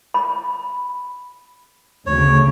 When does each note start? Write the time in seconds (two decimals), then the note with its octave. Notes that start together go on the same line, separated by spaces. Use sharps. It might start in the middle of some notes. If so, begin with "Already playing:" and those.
0.14 B5
2.07 D2 C#3 C#5